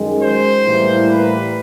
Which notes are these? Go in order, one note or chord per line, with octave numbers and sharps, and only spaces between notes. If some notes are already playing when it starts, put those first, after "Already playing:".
Already playing: F#2 D#3 G#3
C5
A2 E3 G3 A#3
B4